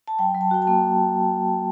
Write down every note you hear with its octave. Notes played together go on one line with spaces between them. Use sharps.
A5
F#3 G5
F#3
A5
F#4 G5
A5
A#3